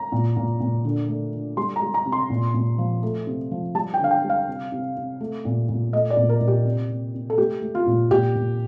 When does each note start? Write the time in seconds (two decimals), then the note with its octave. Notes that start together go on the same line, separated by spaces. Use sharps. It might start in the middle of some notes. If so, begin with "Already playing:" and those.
Already playing: A#5
0.12 A#2
0.37 A#2
0.60 A#2
0.85 D3
1.08 A3
1.33 D3
1.57 G3 C6
1.76 A#5
1.82 G3
1.94 A#5
2.06 C3
2.12 C6
2.30 A#2
2.54 A#2
2.78 F3
3.03 A3
3.27 C3
3.51 F3
3.75 G3 A5
3.94 G5
4.00 D3 F5
4.11 G5
4.24 G3
4.29 F5
4.48 C3
4.72 C3
4.97 C3
5.20 A3
5.45 A#2
5.69 A#2
5.93 A3 D#5
6.10 D5
6.17 A#2
6.29 A#4
6.41 A#2
6.48 G4
6.65 C3
6.90 C3
7.14 C3
7.30 A4
7.38 A3 G4
7.62 A3
7.75 F4
7.86 A#2
8.11 A#2 G4
8.35 A#2